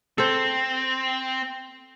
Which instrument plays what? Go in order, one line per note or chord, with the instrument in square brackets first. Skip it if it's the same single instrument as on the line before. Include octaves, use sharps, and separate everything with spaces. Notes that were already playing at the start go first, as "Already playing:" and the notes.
[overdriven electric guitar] C4 [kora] A4 C5